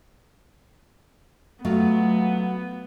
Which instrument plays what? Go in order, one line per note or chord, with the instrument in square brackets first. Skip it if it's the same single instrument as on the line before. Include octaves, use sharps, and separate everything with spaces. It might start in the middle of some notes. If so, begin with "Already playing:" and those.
[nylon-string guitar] F#3 A3 F4 [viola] B3